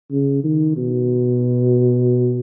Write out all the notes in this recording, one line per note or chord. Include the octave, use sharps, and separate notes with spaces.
C#3
D#3
B2